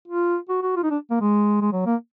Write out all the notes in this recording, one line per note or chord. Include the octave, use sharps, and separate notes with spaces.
F4
F#4
F#4
F4
D#4
D4
A#3
G#3
G#3
F#3
A#3